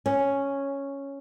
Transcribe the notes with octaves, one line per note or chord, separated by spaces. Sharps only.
C#4